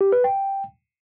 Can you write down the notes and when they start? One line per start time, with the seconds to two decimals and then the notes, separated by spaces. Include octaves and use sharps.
0.01 G4
0.12 B4
0.24 G5